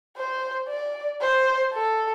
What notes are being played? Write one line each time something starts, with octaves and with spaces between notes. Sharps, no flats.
C5
D5
C5
A4